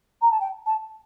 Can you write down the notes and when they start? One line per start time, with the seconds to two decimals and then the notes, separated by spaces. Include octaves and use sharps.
0.21 A#5
0.31 A5
0.40 G5
0.66 A5